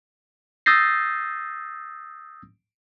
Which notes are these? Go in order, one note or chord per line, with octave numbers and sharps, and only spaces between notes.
D#6 E6 G6 A6 A#6 C7